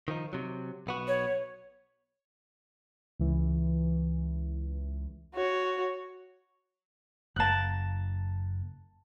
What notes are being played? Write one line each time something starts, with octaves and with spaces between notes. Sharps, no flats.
D#3 F3 D#4
C3 F#3
B1 B3 F#4
C#5
C#2 E3
F#4 C#5
F#1 A#3 A5 F#6